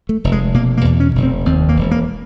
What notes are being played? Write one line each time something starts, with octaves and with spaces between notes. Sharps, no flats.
A3
F1
G#3
B2 A#3
A#3
E2
C#4
F1
C4
D#2 C4
A#3
E1
A#3